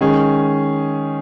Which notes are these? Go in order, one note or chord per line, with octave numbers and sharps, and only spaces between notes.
D#3 G#3 C#4 G#4